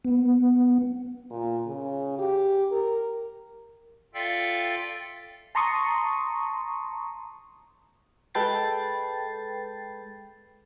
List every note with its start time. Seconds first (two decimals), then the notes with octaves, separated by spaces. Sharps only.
0.04 B3
1.30 A#2
1.66 C#3
2.19 G4
2.72 A#4
4.14 F4 A4 D5 E5 F5 G5
5.55 A5 A#5 C6 C#6 D#6
8.34 G#3 A4 B4 G5 A6 C7